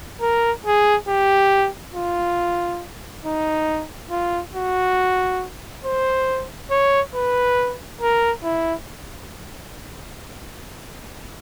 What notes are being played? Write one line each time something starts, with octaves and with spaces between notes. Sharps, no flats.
A#4
G#4
G4
F4
D#4
F4
F#4
C5
C#5
B4
A#4
E4